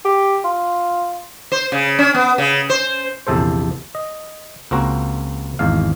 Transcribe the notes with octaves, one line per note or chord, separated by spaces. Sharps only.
G4
F4
C5
C#3
C#4
B3
C#3
C5
A#1 E2 C3 A4 C5
D#5
C#2 A#3 C4 F#4 A#5
G#1 E2 F5